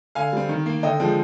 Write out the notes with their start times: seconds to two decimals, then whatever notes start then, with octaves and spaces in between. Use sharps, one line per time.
0.15 D3 F5 G#5
0.33 G3 C4
0.49 D#3
0.66 A#3
0.83 D3 D#5 G5
1.00 F3 G#3 C4